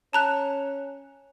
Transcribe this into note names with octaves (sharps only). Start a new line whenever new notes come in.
C#4 A5 A#5 F#6